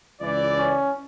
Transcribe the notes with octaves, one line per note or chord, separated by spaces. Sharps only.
C#2 E3 D5
C#4